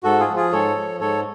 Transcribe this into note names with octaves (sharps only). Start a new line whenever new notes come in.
G#2 F#4 A4
F4 G#4
F3
F4 G#4
G#2 A4 C#5
F3
G#2 A4 C#5